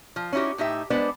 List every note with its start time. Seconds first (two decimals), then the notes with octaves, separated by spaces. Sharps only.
0.16 F3
0.33 C#4 D#4 E4 F#4 G4
0.58 A2 D#4 G4 E5
0.90 G#3 B3 D4 B4 C5 D5